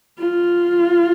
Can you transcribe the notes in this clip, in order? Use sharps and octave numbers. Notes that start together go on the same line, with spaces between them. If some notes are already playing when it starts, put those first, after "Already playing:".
F4